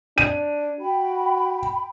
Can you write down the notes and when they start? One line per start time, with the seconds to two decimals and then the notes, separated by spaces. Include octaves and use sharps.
0.18 D4 D#7
0.80 F#4 G5 B5